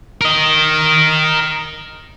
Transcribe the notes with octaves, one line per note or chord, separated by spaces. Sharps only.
A#4 D#5